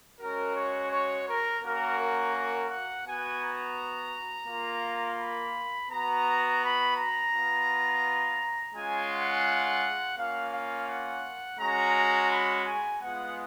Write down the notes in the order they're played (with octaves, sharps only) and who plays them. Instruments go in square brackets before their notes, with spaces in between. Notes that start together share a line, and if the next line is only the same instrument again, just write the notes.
[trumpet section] G#3 C#4 F#4 A#4
C#5
C#5
A#4
A#3 C#4 F#4 A#4
A#4
A#4
F#5
B3 F#4 G#5
A#5
A#3 F4
B5
B3 F#4 A#5
B5
A#5
B3 F4
G#3 C#4 F4 G#5
F#5
A#3 C#4 F4 F5
F5
F#5
G#3 C#4 F#4 A#5
B5
G#5
G#3 B3 F4 F#5